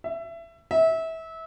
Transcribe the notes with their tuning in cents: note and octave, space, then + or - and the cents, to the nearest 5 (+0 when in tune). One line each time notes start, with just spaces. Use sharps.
E5 +20
E5 -25